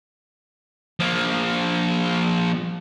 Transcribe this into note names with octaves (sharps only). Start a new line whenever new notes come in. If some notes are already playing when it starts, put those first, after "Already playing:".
F3 A#3